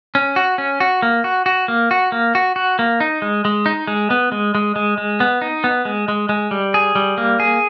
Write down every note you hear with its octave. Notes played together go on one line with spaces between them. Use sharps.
C#4
F#4
C#4
F#4
A#3
F#4
F#4
A#3
F#4
A#3
F#4
F#4
A#3
D#4
G#3
G#3
D#4
G#3
B3
G#3
G#3
G#3
G#3
B3
D#4
B3
G#3
G#3
G#3
G3
G#4
G3
A#3
G#4